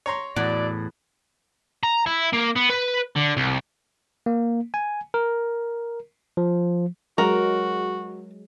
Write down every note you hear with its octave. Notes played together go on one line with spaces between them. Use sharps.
C#5 A#5 C6
E2 A2 F#3 D5 F#5
A#5
E4
A#3
B3
B4
D3
C2
A#3
G#5
A#4
F3
F#3 G#3 F#4 A#4